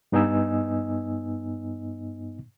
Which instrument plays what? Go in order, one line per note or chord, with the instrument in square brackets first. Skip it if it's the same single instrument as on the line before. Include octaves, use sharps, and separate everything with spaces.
[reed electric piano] G2 B3 D#4 D#5 G#5 E6